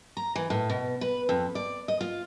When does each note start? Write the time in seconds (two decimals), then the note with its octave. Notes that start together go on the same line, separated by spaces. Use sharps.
0.17 A#5
0.36 E3
0.50 A2
0.70 B2
1.01 B4
1.29 F2
1.55 D5
1.88 D#5
2.01 F4